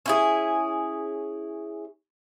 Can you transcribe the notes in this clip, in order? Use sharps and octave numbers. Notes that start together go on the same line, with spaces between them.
C#4 E4 G#4